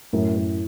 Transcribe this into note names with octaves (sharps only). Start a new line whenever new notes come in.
F#2 A2
F#2